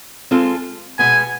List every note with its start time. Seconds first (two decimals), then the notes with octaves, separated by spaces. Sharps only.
0.31 G#3 C4 F4 A4
0.99 B2 G#3 B3 G#5